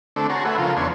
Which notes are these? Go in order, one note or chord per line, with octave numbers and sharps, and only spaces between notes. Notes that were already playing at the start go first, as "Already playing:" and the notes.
D3 A3 C4 D4 A4
F#4 G#4 C#5 A5 A#5 C6
A3 B4 E5 F#5 G#5
C#3 F3 F4 A4 A#4
E2 B3 D4 C#5 G#5 C6